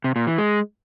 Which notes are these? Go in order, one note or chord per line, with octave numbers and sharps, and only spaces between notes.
C3
A#2
E3
G#3